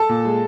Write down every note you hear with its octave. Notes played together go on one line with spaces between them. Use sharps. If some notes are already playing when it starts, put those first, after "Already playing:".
Already playing: A4 A5
A#2
G#3